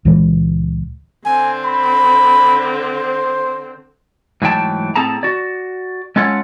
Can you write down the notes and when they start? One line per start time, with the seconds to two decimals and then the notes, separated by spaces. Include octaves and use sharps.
0.05 C#2 A#2 E3 G#3
1.25 D3 C4 G#5
1.65 B5
2.96 C5
4.42 G#2 E3 F#3 A3 G5 A5
4.96 A2 C4 G#4 A4 A5 A#5
5.23 F#4 D5
6.16 G#3 C#4 F4 A4 C#5 F#5